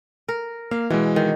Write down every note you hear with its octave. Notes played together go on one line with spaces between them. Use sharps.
A#4
A#3 F5
B2 E3 G#3
D#3